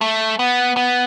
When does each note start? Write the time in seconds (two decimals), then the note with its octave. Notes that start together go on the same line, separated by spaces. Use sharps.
0.01 A3
0.39 B3
0.76 B3